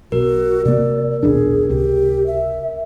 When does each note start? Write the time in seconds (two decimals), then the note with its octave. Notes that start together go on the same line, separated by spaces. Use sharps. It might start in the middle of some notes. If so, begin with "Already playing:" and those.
0.12 B1 F#4 A#4
0.65 C3 A#3 D5
1.23 D#1 B1 D4 G#4
1.69 C#2 C3 G4
2.26 E5